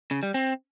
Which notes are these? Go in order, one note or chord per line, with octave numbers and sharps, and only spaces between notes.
C#3
G3
C4